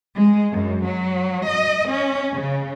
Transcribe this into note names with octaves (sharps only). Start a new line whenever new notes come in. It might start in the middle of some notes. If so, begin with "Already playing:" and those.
G#3
F#2
F#3
D#5
C#4
C#3